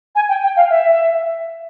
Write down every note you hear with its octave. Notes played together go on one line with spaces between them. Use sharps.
G#5
G5
G5
F5
E5